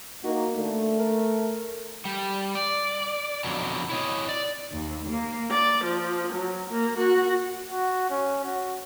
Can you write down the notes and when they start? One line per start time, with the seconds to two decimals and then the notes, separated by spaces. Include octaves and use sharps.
0.24 A#3 D#4 F#4
0.57 D3 A3
0.99 A#4
2.05 G3
2.55 D5
3.44 F2 B2 D3 F#3
3.90 E4 C#5 D#5
4.29 D5
4.71 D#2
5.10 A#3
5.50 D5
5.85 F3
6.34 F#3
6.70 A#3
6.99 F#4
7.69 F#4
8.10 C#4
8.45 F#4